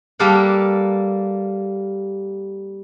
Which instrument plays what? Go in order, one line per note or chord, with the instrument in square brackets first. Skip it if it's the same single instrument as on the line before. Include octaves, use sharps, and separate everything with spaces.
[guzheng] G3 A#3 A4 D5 F5 F#5